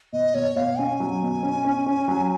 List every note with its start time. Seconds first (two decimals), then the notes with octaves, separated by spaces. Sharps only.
0.13 B2 D#5
0.34 B2 C#5
0.56 B2 F5
0.78 C#4 G#5
1.00 F#3
1.22 B2
1.43 C#4
1.65 C#4
1.86 C#4
2.08 F#3